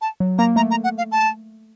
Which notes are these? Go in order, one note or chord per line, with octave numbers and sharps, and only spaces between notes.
A5
F#3
A#3 A#5
A3 A#5
A#5
F#5
F5
A5